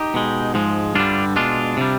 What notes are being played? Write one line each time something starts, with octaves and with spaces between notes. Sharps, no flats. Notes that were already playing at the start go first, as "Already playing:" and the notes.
Already playing: D#4 G4
B2 G#3
G#2 F3 G#3
G2 D3 G3 D4 F4
B2 G#3 D4 F4
C3 G3